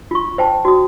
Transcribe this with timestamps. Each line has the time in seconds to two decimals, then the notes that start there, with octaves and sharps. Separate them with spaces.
0.11 F4 C#6
0.38 C5 G5 A5
0.65 F#4 D#6